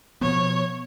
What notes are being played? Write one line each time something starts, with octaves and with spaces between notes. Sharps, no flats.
B2 F3 B3 C#5